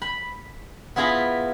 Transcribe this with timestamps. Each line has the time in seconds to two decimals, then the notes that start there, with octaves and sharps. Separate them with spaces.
0.02 B5
0.96 B3 E4 F4 G#4 A#5 B5